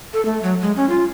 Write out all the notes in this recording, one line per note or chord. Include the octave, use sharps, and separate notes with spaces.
A4
A3
F#3
G#3
C#4
F4